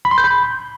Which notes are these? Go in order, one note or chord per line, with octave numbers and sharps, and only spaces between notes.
B5
C6
G6
B5